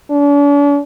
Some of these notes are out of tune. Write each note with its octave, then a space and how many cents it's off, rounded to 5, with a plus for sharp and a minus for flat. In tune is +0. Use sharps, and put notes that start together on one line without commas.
D4 -45